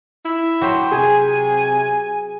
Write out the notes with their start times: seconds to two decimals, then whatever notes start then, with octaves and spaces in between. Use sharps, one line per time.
0.25 E4
0.61 F#3 G4 C5
0.91 C3 G#4 G#5